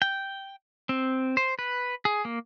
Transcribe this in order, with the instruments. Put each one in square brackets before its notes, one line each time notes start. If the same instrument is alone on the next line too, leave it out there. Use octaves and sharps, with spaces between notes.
[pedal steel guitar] G5
C4
C5
B4
G#4
A#3